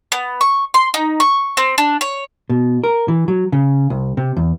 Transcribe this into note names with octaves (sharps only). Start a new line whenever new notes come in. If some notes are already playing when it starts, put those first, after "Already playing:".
B3
C#6
C6
D#4
C#6
C4
D4
C#5
B2
A#4
E3
F#3
C#3
C2
C3
E2